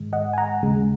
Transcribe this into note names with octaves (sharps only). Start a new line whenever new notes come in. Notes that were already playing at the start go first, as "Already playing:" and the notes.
Already playing: G#2 D#3 G#3
D#5 F#5
G#5
F#5 A#5
D#2 C#3 G#3